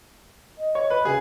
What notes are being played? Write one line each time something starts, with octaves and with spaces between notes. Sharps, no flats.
D#5
C#5
B4
C#3 G#4